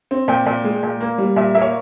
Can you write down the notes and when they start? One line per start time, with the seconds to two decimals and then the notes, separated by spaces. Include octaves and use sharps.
0.11 C4
0.28 A#2 G5
0.46 A#2
0.64 G#3
0.83 A#2
1.01 A#3
1.18 G3
1.36 A#2 E5
1.55 A#3 E5
1.61 C#5